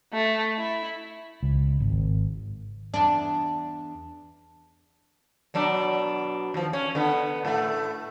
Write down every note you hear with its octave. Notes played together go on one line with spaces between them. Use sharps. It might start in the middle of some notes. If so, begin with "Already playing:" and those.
A3
E4
C#2
G#1
E2 D4
B2 F#3 D4
D#2 F3
C#4
D3 B3
A2 A3